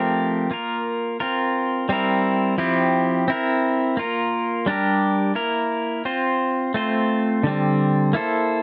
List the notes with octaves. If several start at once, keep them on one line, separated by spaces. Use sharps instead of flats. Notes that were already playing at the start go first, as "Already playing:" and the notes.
Already playing: F3 A3 C4 G4 A#4
A#3 F4 A#4
C4 F4 A#4
G3 C4 E4 A#4
F3 C4 E4 G4
C4 E4 A#4
A#3 F4 A#4
G3 D4 G4 A#4
A#3 E4 A#4
C4 F4 C5
A3 C4 F4 C5
D3 G3 C4
A#3 E4 A4 C5